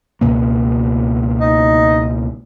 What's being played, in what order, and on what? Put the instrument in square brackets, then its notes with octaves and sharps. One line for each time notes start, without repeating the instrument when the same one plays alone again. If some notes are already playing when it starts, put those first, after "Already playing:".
[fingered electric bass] C#2 B2 A#3
[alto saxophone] D#4